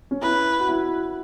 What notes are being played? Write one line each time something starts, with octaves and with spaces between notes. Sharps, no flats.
C#4
E4 B4
F#4
E4